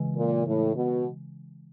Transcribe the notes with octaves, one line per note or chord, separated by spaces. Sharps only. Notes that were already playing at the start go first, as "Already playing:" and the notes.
Already playing: C#3 E3 G#3
A#2
A2
B2